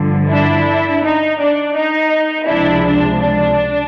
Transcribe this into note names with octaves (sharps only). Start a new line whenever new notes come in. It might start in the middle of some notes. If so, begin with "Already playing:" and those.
Already playing: G2 D3 F3
D4 E4
D#4
D4
D#4
C#2 C3 F3 G#3 D4 E4
D4
D4